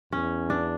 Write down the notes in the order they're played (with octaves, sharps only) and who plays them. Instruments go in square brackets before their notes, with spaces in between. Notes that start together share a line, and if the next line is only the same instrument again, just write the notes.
[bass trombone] E2 [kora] C#4
[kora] D4